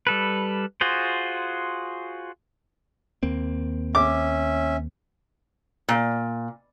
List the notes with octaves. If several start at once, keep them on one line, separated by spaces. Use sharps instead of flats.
G3 A4 B4
F4 F#4 G#4 C5
D#2 A#3 C4
C#4 E5 D6
A#2